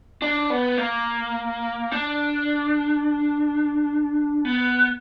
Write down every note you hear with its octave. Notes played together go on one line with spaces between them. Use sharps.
D4
B3
A#3
D4
B3